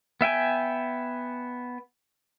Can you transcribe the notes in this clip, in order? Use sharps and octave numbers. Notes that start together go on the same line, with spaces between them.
B3 E5 G5 G#5